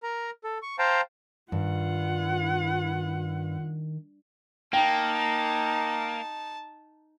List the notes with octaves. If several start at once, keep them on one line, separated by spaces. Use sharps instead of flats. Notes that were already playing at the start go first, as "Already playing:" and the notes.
A#4 A#5
A4
C#6
C5 F5 G5 A5 A#5
G2 D#3 F4 F#5
A#3 D#4 G5 A5